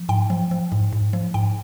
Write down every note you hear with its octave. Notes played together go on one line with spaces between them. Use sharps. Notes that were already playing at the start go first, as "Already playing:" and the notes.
Already playing: F3
G#2 G5
F3
F3
G#2
G#2
F3
G#2 G5